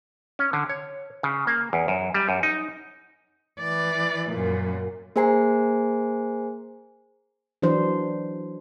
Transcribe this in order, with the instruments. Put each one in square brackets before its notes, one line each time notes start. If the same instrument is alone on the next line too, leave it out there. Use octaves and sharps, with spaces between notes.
[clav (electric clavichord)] C#4
D3
C#5
C#3
A#3
E2
F#2
G3
F#2
D#4
[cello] E3 D5
F#2 A#2
[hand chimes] A#3 G#4 C5 G#5 A#5 C7
[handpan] E3 F#3 D4 C5